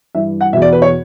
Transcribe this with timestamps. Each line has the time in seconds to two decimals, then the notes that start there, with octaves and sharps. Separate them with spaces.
0.15 G2 E3 E5
0.41 F#5
0.53 B2 E5
0.56 E2
0.62 D5
0.72 B4
0.82 C#5